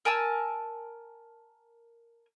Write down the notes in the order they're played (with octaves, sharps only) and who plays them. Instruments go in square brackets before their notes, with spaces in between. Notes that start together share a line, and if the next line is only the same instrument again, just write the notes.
[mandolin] A#4 G#5 A5 E6